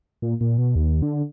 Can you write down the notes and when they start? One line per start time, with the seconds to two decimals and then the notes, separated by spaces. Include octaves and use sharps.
0.22 A#2
0.41 A#2
0.58 B2
0.75 D#2
1.02 D3